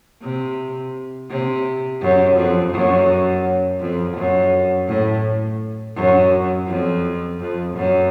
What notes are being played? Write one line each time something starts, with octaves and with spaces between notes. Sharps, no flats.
C3
C3
F#2
F2
F#2
F2
F#2
A2
F#2
F2
F2
F#2